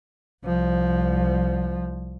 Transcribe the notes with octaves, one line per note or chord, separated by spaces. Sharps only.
C2 F3